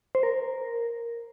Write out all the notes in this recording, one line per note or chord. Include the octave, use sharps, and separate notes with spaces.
C5
A#4